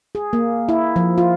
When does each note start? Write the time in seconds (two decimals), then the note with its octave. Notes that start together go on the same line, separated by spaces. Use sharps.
0.15 G#4
0.33 A#3
0.69 E4
0.96 F3
1.18 F4